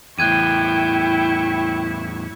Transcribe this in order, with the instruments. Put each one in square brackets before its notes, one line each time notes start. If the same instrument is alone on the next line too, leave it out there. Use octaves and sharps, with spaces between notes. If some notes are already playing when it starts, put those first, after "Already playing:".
[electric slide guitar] E2 A2 [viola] E4 C#6 [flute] G5 [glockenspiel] F#6 G#6 D#7